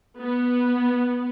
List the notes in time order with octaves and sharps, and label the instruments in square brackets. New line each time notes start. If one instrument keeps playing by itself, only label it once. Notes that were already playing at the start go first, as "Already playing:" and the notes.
[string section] B3